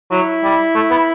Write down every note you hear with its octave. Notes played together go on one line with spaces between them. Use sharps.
F#3 E4
G3
A3
B3